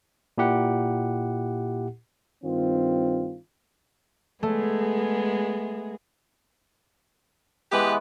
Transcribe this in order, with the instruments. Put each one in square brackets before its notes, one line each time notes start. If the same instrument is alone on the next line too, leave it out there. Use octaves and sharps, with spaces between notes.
[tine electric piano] A#2 E4 G4 F#5
[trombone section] G2 D#3 C4 F4
[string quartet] G#3 B3 G#4 [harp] A3
[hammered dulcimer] E3 G#3 B3 [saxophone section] G4 B4